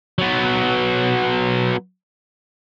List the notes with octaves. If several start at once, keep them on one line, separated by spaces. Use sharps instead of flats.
F#3 B3